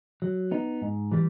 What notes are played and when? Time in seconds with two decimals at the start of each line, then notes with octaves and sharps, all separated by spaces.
0.22 F#3
0.51 B3 D#4
0.82 G#2
1.12 E3 G3